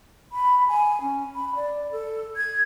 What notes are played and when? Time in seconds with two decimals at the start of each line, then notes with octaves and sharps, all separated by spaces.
0.32 B5
0.68 G#5
1.01 C#4
1.35 B5
1.56 D5
1.92 A4
2.36 G#6